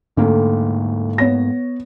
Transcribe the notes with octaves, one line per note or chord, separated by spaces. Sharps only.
D2 G#2 A3 A#3
B3 C#5 A#6